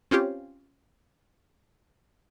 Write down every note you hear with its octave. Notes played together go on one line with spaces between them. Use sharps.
C4 C#4 F4 G4